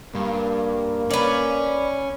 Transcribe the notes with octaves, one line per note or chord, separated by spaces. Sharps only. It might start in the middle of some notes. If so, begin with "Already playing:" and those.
G2 A#3
C#4 B4 D5